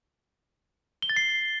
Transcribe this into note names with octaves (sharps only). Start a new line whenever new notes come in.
G7
A6
C7